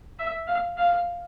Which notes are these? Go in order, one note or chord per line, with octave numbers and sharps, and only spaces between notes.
E5
F5
F5